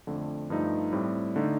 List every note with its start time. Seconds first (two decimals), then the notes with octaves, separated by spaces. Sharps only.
0.07 F2 D3 A3
0.50 G2 F3 A3 D#4
0.93 A2 G3 C4
1.36 D3 A3 D#4